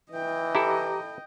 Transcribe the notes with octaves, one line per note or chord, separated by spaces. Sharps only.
E3 D#5 G5
E4 G4 A4 A#5 D6